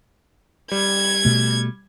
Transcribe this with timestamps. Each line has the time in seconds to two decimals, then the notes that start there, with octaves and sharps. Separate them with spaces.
0.72 G3 G#6
1.25 B2 A3